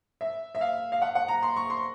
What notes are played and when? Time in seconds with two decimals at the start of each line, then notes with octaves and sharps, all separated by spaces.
0.21 E5
0.55 E5
0.61 F5
0.92 F5
1.02 F#5
1.15 F#5
1.28 A#5
1.43 C6
1.56 C#6
1.70 C6